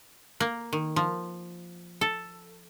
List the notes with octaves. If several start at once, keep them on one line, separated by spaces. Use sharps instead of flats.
A#3
D#3
F3
A4